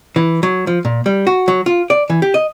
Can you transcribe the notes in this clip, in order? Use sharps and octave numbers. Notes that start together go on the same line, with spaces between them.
E3
F#3
F3
A#2
G3
F#4
F#3
F4
D5
E3
G4
D#5